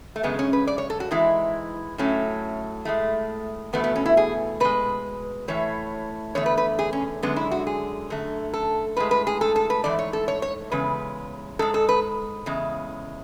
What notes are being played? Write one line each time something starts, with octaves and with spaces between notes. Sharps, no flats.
A3
F#2 C#3 G#3 B3
C#4
B4
D5
C#5
A4
F#4
G#2 E3 G#3 E4
A2 F#3 A3 C#4
A2 G#3 A3
E2 B2 A3 B3
B3
C#4
E4
G#4
B2 G#3 B4
A2 E3 A3 C#5
E2 D3 A3 C#5
B4
B4
G#4
C#4
F#2 D3 G#3 B3
E4
F#4
G#4
F#2 D3 A3
A4
A2 G#3 B4
B4
G#4
A4
A4
B4
G#2 E3 A3 D5
C#5
A4
C#5
C#5
E2 C#3 G#3 B4
G#2 G#3 A4
A4
B4
E2 C#3 G#3